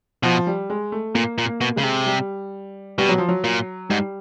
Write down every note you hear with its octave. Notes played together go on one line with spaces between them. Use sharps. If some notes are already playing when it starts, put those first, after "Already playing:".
B2 F3
G3
G#3
A3
A#2 A#3
A#2
A#3
B2
C#3 G#3
C3
G3
B2 G3
F#3
F3
F#3
A#2
G#2 G3